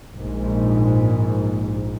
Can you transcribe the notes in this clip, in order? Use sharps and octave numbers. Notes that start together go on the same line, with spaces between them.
A#1 G#2